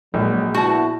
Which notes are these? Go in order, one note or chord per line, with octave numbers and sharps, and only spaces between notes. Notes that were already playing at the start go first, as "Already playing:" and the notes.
A#1 F#3 G#3
B3 E4 F#4 A5